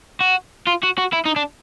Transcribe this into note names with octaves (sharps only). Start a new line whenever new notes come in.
F#4
F4
F#4
F#4
E4
D#4
D4